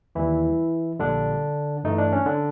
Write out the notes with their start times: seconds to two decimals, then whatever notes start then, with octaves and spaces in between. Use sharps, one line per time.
0.15 D#2 D#3 E3 G3 E4
0.99 A#1 A#2 D3 G3 D4
1.84 G2 E3 A3 D#4
1.98 D4
2.13 C#4
2.26 D3 D4